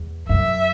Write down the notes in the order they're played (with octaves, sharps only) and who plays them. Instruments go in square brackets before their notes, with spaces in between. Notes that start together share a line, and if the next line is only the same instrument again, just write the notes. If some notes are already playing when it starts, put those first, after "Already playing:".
Already playing: [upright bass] E2
[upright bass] F#2 [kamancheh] E5